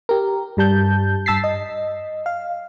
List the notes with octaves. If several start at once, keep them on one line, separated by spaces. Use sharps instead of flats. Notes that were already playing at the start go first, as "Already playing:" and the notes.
G4 A#4
G2 G3 A5 G6
G2 A5 E6 A6 B6 C7
D#5
F5